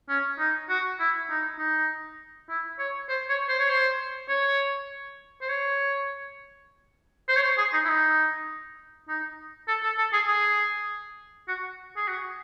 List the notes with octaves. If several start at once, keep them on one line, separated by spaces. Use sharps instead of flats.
C#4
D#4
F#4
E4
D#4
D#4
E4
C#5
C5
C#5
C5
C#5
C5
C#5
C5
C#5
C5
C#5
C5
G#4
D#4
E4
D#4
D#4
A4
A4
A4
G#4
G#4
F#4
G#4
F#4